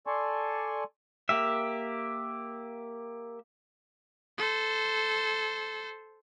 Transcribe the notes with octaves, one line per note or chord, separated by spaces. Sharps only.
A4 D5 G#5 A5 C6 C#6
A#3 G4 E5
A4 C5